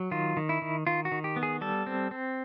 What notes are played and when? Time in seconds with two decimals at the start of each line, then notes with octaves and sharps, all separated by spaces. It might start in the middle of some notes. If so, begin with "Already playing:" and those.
Already playing: F#3
0.11 D#3 F4
0.37 D#3
0.49 E4
0.62 D#3
0.87 D#3 F4
1.05 F#4
1.12 D#3
1.24 G4
1.36 B3
1.43 G#4
1.61 G3 A4
1.87 C4
2.11 C4